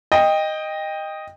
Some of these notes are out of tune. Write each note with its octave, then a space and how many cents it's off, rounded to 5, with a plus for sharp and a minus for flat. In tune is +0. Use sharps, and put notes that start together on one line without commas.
D#5 +0 G5 +15